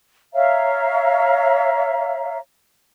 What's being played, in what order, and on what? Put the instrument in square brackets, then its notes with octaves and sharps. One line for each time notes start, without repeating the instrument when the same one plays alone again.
[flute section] C#5 E5 F5 A#5